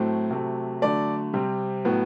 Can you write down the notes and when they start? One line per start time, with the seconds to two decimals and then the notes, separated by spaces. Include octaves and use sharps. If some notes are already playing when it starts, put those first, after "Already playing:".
Already playing: A2 F#3 A3 C4
0.31 C3 F#3 A3
0.82 D3 F#3 A3 D5
1.33 C3 G3 C4
1.85 A2 F#3 B3